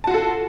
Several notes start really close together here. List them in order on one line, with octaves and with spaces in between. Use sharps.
A5 F#4 F4 A4